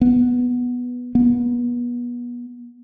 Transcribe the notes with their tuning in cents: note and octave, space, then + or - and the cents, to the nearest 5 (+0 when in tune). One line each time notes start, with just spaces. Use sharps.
B3 -5
B3 -30